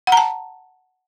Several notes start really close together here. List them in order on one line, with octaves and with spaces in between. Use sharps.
F#5 A#5 A5